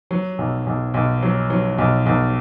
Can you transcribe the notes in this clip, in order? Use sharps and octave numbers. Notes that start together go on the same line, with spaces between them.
F#3
B1
B1
B1
F#3
F#3
B1
B1